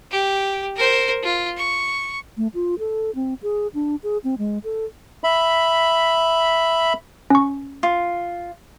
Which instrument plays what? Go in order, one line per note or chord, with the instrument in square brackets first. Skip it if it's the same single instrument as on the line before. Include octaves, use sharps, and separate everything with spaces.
[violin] G4
A#4 C5
F4
C#6
[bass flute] A3
F4
A4
C4
G#4
D4
G#4
C4
G#3
A4
[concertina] E5 B5
[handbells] C#4 C#6
[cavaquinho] F4